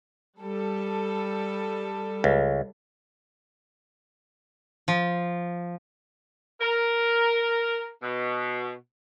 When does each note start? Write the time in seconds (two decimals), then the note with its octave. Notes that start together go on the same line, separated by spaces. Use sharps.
0.39 G3 A4
2.24 C#2
4.88 F3
6.61 A#4
8.03 B2